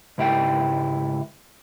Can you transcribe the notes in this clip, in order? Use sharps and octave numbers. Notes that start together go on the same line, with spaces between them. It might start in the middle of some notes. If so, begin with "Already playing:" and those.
C#2 G#2 E4 G4 E5 G5